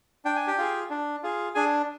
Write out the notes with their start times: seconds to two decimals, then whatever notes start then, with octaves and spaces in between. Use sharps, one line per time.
0.25 D4 G5
0.36 G#5
0.47 G4 G5
0.58 F4 G#4
0.90 D4
1.23 F4 G#4
1.55 D4 G#4 G#5